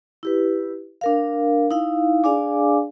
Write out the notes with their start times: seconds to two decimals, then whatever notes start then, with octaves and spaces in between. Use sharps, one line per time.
0.23 E4 G4 B4
1.01 D4 A#4 F5
1.71 D#4 E4 F5
2.24 D4 G#4 D5 F5 G#5 D6